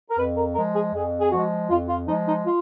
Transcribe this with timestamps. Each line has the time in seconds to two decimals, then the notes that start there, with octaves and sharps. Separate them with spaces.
0.09 A#4
0.17 F2 B4
0.36 A#4
0.55 F3 G#3 A#4
0.74 G#4
0.93 F2 G#4
1.20 G#4
1.32 F3 G#3 F#4
1.70 F2 F4
1.89 F4
2.08 F3 G#3 D#4
2.27 D#4
2.46 F4